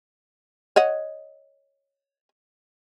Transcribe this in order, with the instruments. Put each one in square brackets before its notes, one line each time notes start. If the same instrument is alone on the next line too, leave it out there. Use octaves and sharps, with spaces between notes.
[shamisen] C#5 D#5 F#5